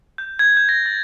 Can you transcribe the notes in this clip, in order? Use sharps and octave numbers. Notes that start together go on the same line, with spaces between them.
G6
G#6
G6
A#6
A6